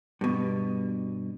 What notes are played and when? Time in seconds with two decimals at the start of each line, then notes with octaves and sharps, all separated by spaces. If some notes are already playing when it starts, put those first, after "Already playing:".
0.21 G2 B2